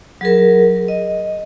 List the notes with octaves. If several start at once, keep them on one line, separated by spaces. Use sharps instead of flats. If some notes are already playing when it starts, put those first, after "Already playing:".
F#3 G#4 A#4
D#5